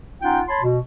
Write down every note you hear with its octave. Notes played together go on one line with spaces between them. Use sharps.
C#4 D#4 F4 F#5 G5
C#5 A5 B5 C6
B2